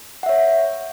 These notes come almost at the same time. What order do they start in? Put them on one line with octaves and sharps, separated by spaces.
F#5 E5 C#5